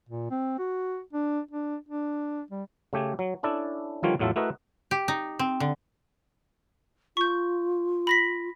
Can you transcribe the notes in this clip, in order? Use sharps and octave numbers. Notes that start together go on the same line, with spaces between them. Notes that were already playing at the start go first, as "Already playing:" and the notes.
A#2
C4
F#4
D4
D4
D4
G3
C#3 A3 G4 G#5
F#3
C#4 D4 E4 A4 D5
D3 D#3 F3 G3 F4 C#5
E2 A2 F#3 F4 E5 A5
A3 E4 F#4 A#4 B4 D#5
G4
D#4
C4
D3
F4 C#6 G6
B5 A#6 B6